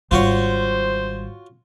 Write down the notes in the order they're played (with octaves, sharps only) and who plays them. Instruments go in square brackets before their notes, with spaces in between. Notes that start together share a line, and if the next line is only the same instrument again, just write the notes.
[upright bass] G#1 G3 [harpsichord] F4 F#4 C#5 [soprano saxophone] C5